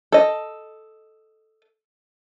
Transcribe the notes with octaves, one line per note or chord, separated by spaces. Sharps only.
A4 D#5